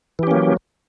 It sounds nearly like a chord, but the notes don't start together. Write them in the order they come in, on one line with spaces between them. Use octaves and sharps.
E3 G4 C#4 A#3 F#3